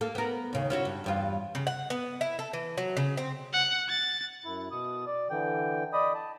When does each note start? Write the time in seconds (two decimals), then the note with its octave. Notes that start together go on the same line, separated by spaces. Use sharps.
0.01 A#3 A4
0.15 B3 A#4
0.53 D#2 C#3
0.70 C#4 E4 F#4
0.85 G2
1.04 E2 G2 F4
1.55 C#3
1.67 F#5
1.90 B3
2.21 E4
2.39 A4
2.53 E3
2.78 F#3
2.97 C#3
3.17 C4
3.54 F#5
3.89 A6
4.45 F#2 E4
4.71 B2 D#6
5.07 D5
5.30 D3 E3 G5
5.93 D5 D#5 B5 D#6
6.15 A5